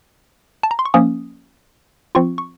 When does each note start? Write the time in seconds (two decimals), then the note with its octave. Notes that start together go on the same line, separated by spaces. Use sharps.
0.63 A5
0.71 A#5
0.79 C6
0.85 C#6
0.94 F3 A#3 C#4 D#6
2.15 F3 C4 F4 C#6
2.38 C#6